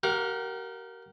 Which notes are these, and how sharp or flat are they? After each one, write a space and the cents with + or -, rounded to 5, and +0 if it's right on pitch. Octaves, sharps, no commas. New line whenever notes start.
G4 -40 A#4 +0 F#5 -45